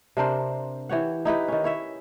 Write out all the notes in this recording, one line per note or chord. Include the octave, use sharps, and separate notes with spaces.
C3 D4 A#4 C5
E3 G4 C#5 F#5
D#4 E4 G4 B4
D#3 C#4
E4 C#5 E5